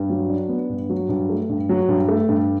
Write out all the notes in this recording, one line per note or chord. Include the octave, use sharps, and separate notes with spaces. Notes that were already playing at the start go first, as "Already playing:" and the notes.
Already playing: G2
F#3
D4
B3
G2
F#3
G2
A3
G2
F#3
G2
A3
G2